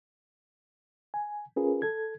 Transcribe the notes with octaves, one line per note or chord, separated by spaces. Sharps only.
G#5
C#4 F4 G#4 A#4 B4
A4 G#6